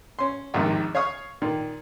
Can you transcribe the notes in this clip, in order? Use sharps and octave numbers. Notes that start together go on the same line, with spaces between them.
C#4 C6
A#1 D#2 G#2 C3 D#3
C#5 F5 C#6 D#6 F6
A#2 D#3